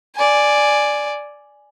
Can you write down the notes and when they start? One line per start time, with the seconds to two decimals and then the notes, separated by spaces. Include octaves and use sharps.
0.16 D5 G#5